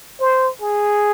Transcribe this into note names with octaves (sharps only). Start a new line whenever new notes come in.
C5
G#4